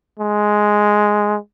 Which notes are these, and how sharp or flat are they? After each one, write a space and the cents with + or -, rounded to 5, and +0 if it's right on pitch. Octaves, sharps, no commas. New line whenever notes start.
G#3 +5